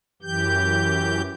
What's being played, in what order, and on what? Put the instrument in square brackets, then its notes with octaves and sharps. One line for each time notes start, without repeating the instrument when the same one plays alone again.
[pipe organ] F#2 E3 G4 G6